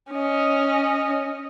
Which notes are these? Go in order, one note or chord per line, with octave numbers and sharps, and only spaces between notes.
C#4 D#5